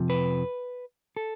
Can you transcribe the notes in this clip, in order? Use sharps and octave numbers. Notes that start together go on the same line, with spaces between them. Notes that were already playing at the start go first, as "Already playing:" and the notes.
Already playing: F2 C3 F3
B4
A4